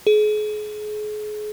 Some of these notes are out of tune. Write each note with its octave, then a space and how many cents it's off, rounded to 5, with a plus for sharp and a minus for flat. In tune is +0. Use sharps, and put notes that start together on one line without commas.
G#4 +35